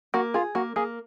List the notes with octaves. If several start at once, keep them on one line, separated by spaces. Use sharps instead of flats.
A#3 F#4
F4 G#4
A#3 F#4
A#3 G#4